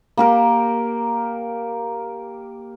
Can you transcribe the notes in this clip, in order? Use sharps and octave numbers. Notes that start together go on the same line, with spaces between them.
A#3 G4 A#4